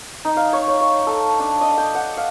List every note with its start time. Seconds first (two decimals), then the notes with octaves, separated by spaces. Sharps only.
0.25 D#4
0.37 F5
0.53 C#5
0.68 C#5
0.81 C#5
1.07 A4
1.40 D4
1.61 D#5
1.78 G5
1.95 F#5
2.17 F5